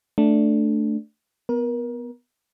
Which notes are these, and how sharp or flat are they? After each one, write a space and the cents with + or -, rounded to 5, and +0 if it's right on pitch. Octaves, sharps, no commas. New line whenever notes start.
A3 +0 D4 +0
B3 +0 A#4 +30